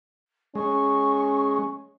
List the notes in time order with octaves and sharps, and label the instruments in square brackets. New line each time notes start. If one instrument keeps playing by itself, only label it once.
[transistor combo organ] G#3 [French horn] C#4 [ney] C#6